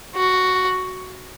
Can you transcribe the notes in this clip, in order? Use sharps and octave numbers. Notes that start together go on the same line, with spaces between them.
F#4